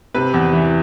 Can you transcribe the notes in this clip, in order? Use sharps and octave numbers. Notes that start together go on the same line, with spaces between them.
C3 B4
E2
E3